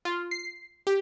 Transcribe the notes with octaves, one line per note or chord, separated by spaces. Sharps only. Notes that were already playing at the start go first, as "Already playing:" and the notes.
F4
C7
G4